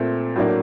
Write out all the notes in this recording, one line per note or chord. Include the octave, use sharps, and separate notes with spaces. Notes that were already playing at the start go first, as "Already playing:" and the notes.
Already playing: A#2 A3 C4
A2 F#3 A#3 D4